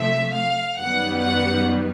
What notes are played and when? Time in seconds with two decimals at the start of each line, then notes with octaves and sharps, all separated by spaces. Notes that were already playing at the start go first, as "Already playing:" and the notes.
Already playing: C3 F3 A3 E5
0.34 F5
0.78 F#2 D#3 G3 B3 F#5
1.22 F#5